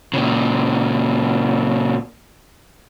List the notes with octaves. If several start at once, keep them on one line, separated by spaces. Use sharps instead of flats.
A#2 C#3